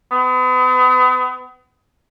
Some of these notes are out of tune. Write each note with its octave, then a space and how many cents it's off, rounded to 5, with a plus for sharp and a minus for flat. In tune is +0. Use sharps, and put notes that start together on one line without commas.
B3 +40